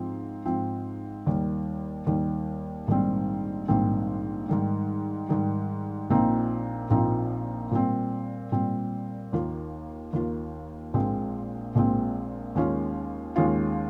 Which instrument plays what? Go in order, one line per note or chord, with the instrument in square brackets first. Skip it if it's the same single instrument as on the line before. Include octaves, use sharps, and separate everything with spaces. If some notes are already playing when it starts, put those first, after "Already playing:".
Already playing: [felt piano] G#2 F3 C4
G#2 F3 C4
D#2 D#3 G3
D#2 D#3 G3
A#1 G#2 D#3 G3 C4
A#1 G#2 D#3 G3 C4
G#2 D#3 G3
G#2 D#3 G3
A#1 A#2 F3 C4 D#4
A#1 A#2 F3 C4 D#4
A#2 G3 C4
A#2 G3 C4
D#2 D#3 A#3 F4
D#2 D#3 A#3 F4
A#1 A#2 G#3 C4
A#1 A#2 G#3 C4
D#2 D#3 G#3 C#4 F4
D#2 D#3 G#3 C#4 F4